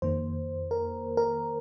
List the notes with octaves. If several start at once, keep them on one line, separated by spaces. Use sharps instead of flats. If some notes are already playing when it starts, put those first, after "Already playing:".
F2 D#3 A#3 C5
A#4
A#4